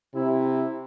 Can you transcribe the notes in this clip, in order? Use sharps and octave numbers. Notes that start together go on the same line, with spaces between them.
C3 E4